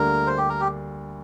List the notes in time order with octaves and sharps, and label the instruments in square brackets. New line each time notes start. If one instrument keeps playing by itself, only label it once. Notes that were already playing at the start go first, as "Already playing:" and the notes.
Already playing: [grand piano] D2 D3 G3 A#3 D4 [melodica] A#4
[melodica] C5
G4
A#4
G4